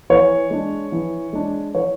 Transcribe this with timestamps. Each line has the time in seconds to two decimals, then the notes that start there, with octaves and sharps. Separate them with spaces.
0.10 E3 C#5
0.50 G#3 D4
0.92 E3
1.33 G#3 D4
1.74 E3 C#5